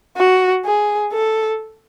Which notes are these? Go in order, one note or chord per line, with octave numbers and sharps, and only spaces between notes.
F#4
G#4
A4